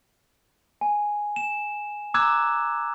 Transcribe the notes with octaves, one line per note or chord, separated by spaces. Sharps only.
G#5
E7
A#5 D6 E6 F#6 G#6 E7